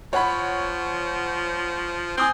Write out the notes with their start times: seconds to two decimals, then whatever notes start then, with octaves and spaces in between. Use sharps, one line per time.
0.13 F3 C#5 F#5 B5
2.18 C4 G#5 D#6 G6